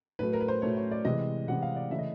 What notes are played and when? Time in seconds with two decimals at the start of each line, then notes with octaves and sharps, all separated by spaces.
0.19 A2 F#3 A3 B4
0.33 A#4
0.41 B4
0.48 C5
0.62 A2 F#3 A3 C#5
0.77 C#5
0.91 D5
1.05 C3 E3 G#3 D#5
1.47 C3 E3 G#3 F#5
1.63 F5
1.76 D5
1.91 C#3 E3 A3 E5
1.99 D#5